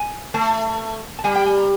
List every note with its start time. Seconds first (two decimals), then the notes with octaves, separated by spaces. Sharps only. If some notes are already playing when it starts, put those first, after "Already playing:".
Already playing: G#5
0.34 A3 A5
1.19 A5
1.24 G3 G#5
1.35 G5
1.46 G#5
1.58 A#5